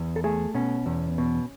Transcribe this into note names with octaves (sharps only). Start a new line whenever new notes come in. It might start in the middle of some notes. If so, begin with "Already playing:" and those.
Already playing: E2
A4
A3 G#4
B2 C#4
E2
B2